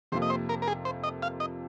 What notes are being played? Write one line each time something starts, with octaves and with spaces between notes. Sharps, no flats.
F2 C3 F3 A#3 C5
D#5
C5
A#4
A#4
G#4
C5
D#5
F5
D#5